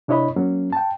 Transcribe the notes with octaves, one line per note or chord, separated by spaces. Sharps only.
C3 D4 E4 C#5 D#5 B5
F#3 A#3 C#4
G5 A5